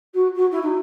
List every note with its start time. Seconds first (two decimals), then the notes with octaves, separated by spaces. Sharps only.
0.14 F#4
0.35 F#4
0.51 E4
0.62 D#4